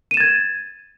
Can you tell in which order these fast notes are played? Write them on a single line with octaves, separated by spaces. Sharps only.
D#7 E7 A6 G#6